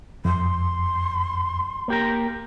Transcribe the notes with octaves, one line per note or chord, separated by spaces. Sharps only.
F2 C6
A#3 G4 A#4